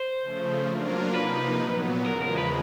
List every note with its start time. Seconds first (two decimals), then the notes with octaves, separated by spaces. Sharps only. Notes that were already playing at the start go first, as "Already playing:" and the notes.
Already playing: C5
0.22 C#3 F3 A3
0.68 F#3 A#3 D4 F4 A#4
1.14 C3 F3 A#3 D#4 B4
1.61 A#2 F#3 B3
2.06 E2 C#3 F3 G#3 A#4
2.22 A#4
2.38 B4